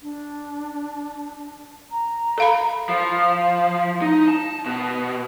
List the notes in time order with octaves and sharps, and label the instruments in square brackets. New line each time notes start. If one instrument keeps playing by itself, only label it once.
[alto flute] D4
A#5
[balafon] A4 F5 B5
[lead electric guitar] F3
D#4
A5
B2